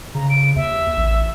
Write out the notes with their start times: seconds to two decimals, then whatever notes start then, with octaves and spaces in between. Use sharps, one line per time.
0.15 C#3 A#5
0.30 D7
0.56 D#2 E5
0.97 A1